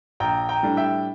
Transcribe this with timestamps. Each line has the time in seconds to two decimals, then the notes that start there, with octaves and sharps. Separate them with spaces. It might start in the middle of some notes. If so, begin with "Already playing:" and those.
0.20 A#1 G5 A#5
0.49 G5 A#5
0.63 A2 G3 D4
0.77 E5 G5